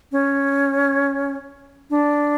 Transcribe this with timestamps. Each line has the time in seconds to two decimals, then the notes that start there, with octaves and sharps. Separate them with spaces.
0.12 C#4
1.90 D4